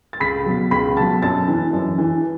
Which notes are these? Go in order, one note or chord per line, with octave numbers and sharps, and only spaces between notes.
A6
C#2 B5 B6
B2 F#3
C#2 B5 B6
B2 F#3 A5 A6
F#2 A5 A6
E3
F#2
E3